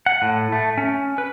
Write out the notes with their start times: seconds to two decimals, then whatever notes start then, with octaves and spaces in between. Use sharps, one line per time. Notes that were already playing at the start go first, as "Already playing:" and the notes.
0.06 F#5
0.22 A2
0.52 A3
0.78 C#4
1.18 B4